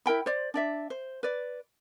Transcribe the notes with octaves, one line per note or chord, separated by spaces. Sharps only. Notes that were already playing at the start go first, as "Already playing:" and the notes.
E4 A#4 G5 B5
C5 D5
D4 D5 E5
C5
B4 D5